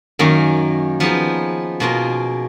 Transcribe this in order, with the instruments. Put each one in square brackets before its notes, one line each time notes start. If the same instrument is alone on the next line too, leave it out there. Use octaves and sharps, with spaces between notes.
[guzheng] F#2 D#3 A#3 C#4
F3 B3 D#4 G#4
B2 A#3 F4 G#4